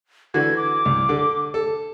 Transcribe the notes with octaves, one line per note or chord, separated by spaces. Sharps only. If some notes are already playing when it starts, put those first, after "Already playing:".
D3 E3 F#4 G#6
D6
C2
D3
A4